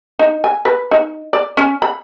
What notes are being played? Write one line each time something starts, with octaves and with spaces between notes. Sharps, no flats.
D#4
G#5
B4
D#4
D5
C#4
B5